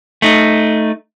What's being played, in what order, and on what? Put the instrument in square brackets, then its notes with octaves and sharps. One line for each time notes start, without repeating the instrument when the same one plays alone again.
[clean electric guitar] A3 D#4